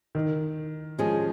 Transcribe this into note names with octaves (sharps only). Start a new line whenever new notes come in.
D#3
F3 G#3 C#4 G#4